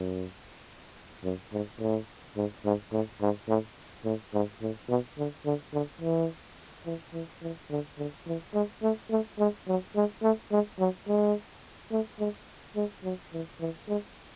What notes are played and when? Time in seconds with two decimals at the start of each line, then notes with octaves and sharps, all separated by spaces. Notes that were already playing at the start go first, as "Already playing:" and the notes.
Already playing: F#2
1.24 F#2
1.53 G#2
1.80 A2
2.37 G#2
2.65 G#2
2.92 A2
3.21 G#2
3.48 A2
4.05 A2
4.34 G#2
4.61 A2
4.89 B2
5.18 D3
5.46 D3
5.73 D3
6.02 E3
6.86 E3
7.14 E3
7.42 E3
7.70 D3
7.98 D3
8.27 E3
8.54 G#3
8.83 A3
9.10 A3
9.39 G#3
9.68 F#3
9.96 G#3
10.23 A3
10.51 G#3
10.79 F#3
11.08 G#3
11.92 A3
12.19 G#3
12.76 G#3
13.04 F#3
13.33 E3
13.60 E3
13.88 G#3